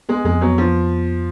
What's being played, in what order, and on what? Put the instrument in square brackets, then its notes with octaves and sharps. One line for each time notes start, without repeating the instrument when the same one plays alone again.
[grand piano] G#3 [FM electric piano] B3
[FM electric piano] F2 [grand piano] G#3
[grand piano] F#3 [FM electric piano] B3
[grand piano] F3